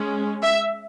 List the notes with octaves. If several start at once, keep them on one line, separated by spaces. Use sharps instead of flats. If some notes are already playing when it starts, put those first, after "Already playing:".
Already playing: G#3 C#4
E5